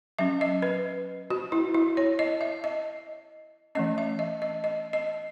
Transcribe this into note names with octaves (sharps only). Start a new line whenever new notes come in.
F#3 C#4 E5
D#5
B4
F#4
E4
E4
C#5
D#5
E5
D#5
E3 A3 C#4 D#5
E5
D#5
D#5
D#5
D#5